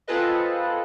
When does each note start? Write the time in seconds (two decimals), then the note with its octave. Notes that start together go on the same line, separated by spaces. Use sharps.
0.08 C4 F4 G#4 A4 B4 D#5